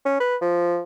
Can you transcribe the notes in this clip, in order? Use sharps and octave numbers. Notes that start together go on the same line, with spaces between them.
C#4
B4
F3